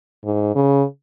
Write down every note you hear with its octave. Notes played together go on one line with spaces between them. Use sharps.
G#2
C#3